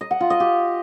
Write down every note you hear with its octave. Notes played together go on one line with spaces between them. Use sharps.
D#5
F#5
F4
D#5
G4